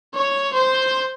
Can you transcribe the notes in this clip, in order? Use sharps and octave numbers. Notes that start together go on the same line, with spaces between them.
C#5
C5